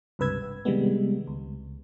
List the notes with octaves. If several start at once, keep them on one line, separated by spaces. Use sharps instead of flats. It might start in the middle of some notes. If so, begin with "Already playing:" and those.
C#2 G2 C3 B4 E6 G#6
G#1
C3 D#3 G3 G#3 B3
C#2